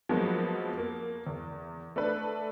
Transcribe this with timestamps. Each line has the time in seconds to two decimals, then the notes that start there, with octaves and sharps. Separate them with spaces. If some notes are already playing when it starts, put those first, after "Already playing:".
0.09 F3 F#3 G#3 A#3 B3 F#4
0.78 A#3
1.27 E2
1.96 A3 D4 A4 B4